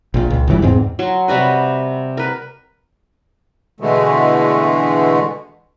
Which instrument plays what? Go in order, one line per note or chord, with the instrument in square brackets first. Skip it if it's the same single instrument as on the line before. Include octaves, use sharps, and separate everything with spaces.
[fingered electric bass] A#1 A#2
C#2
G1 C#3 E3 G3
E2 G#2 C4
[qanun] F#3 C6
C3 G3 F#4 B4
A#4 B4
[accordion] B2 D3 E3 G#3 A3